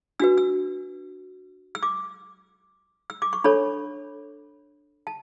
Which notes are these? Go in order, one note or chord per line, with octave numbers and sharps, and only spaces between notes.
D4 F#4 B4 E6
E6
E6
D6
E6
D6
C#6
D4 A4 C#5 B5
A5